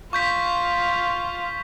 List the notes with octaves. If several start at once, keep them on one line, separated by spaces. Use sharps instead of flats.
F4 C#6 G6 B6